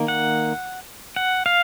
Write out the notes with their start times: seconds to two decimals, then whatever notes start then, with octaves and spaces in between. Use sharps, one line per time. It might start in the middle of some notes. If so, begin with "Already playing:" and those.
Already playing: D#3 A#3
0.08 F#5
1.16 F#5
1.46 F5